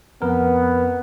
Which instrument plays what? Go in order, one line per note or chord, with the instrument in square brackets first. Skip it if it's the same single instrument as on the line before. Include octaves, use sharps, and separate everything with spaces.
[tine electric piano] F2 A#4 [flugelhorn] B3